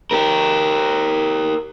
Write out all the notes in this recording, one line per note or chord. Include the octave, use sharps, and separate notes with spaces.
G4 A#4